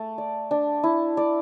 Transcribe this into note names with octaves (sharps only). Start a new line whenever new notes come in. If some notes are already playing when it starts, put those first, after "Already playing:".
Already playing: A3 A4
D5
D4
E4
D5